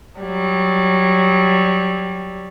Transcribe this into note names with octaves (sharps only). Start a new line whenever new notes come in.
F#3 G3